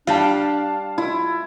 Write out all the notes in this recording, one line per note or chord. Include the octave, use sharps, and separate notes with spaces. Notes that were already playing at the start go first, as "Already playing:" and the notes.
G3 D4 G4 F5 A5
E4 F4